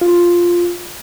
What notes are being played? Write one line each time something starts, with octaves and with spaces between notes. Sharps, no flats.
F4